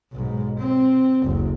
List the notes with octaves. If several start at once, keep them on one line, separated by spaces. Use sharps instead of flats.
B1 G#2
C4
F#1 D2